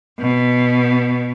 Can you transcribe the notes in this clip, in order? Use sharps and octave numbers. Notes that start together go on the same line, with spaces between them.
B2